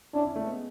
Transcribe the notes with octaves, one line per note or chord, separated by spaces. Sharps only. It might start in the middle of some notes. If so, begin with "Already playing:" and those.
C#4 D4 E4
C#4 E4
A3 C#4
G#3 B3